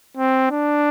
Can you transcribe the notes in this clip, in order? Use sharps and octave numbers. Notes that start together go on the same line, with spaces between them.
C4
D4